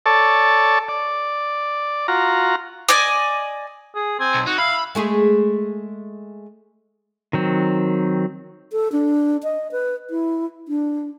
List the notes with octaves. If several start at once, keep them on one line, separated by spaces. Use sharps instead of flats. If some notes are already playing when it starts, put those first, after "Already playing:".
A4 C#5 D5 A5
D5
F4 F#4 A#5
D5 D#5 G#5 D6
G#4
C4 G#5
B1
D#4 F#4
E5 F5 B5
G#3 A3 G#4
D#3 F#3 C4
A4
D4
D#5
B4
E4
D4